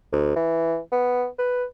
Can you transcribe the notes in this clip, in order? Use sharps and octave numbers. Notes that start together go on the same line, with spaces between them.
D2
E3
B3
B4